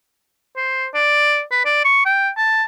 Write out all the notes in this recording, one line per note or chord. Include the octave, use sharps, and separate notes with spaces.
C5
D5
B4
D5
C#6
G5
A5